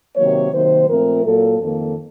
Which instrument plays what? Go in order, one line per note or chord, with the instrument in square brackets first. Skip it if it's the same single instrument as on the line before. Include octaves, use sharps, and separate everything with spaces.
[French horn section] C3 D#3 F#3 A#3 C#5
C3 D#3 F#3 A#3 C5
A#2 F3 A3 C4 A#4
A#2 F#3 A#3 A4
F2 D#3 A#3 A4